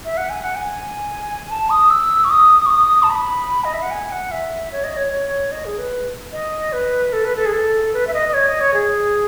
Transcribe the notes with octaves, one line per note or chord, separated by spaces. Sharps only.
E5
F#5
G#5
F#5
G#5
A5
D#6
E6
C#6
D#6
C#6
D#6
A5
B5
D#5
E5
F#5
G#5
F#5
E5
C#5
D#5
C#5
C#5
D#5
G#4
B4
D#5
B4
A4
B4
A4
G#4
A4
B4
E5
D#5
D#5
C#5
D#5
C#5
G#4